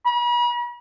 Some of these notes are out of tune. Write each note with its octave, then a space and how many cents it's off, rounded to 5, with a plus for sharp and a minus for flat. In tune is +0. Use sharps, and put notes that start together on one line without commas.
B5 -40